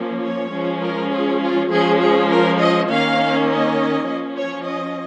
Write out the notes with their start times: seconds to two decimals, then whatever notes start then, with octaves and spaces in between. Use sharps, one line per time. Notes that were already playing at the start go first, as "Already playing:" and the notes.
Already playing: F3 A#3 C#4
0.23 C#5
0.52 F3 G#3 C#4
0.81 A#4
1.11 G#4
1.40 F4
1.70 F3 G#3 C#4 G#4
2.00 G#4
2.29 A#4
2.59 D#5
2.88 D#3 A#3 C#4 F5
3.48 D#5
4.07 F3 C#4
4.37 C#5
4.66 D#5